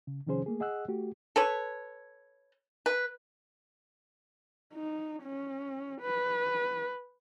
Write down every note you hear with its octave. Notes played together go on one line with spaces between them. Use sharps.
C#3
C3 D#3 F3 C#4 G#4 C5
A3 A#3 G#4
G#4 D#5 F#5 E6 F#6
A3 F#4 G4
A4 B4 C#5
B4
D#4
C#4
B4